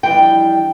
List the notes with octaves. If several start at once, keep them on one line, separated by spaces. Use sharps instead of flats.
F2 E3 G3 D4 G5